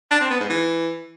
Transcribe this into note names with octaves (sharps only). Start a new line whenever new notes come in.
D4
C4
B3
G#2
E3